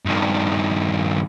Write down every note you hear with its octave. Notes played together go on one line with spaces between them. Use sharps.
G2 D#3